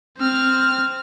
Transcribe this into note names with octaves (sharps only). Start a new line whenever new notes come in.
C4 F6